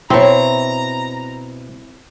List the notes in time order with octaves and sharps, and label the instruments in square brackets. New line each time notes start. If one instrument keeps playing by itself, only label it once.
[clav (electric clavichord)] B2 A5 [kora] C4 [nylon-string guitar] E4 C#5 [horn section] A#5